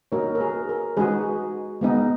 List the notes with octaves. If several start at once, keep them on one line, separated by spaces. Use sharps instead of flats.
A#3 D#4 F#4 A#4 C#5
A#4
G#4 B4
A#4
G#3 D#4 F#4 G#4 B4
G#3 B3 D#4